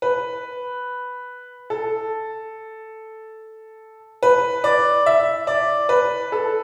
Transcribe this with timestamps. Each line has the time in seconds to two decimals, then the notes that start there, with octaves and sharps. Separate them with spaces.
0.02 B4
1.70 A4
4.23 B4
4.64 D5
5.06 E5
5.47 D5
5.89 B4
6.32 A4